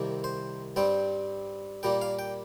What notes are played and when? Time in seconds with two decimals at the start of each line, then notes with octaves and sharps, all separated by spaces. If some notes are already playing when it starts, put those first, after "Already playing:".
Already playing: C2 C3 D#3 A#3
0.24 C5
0.76 G2 G3 C4 G5
1.83 A#2 G3 A#3 G5
2.01 F5
2.19 G5